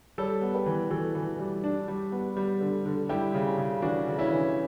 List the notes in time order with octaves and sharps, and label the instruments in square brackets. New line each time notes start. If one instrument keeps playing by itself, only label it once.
[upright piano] G3 [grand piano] A4 C#5
[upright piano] B3
[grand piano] G4 B4
[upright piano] E3
[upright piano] E3 [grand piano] F#4 A4
[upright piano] E3
G3
D4
G3
B3
G3
D3
D3
[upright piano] G3 [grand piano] E4 G4
[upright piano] C#3
C#3
[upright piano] E3 [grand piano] D4 F#4
[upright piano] C#3
[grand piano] C#4 E4
[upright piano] E3